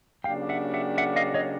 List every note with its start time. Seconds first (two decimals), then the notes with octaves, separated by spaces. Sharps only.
0.24 C#3 F#3 A#3 D4 G4 F5 G5
0.49 E5 F#5
0.74 E5 F#5
0.98 E5 F#5
1.16 D#5 F5
1.34 C#5 D#5